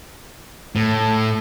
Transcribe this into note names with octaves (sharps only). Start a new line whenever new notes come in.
A2